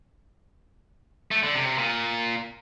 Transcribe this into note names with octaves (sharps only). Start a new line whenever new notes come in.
A3
D3
C3
C3
A#2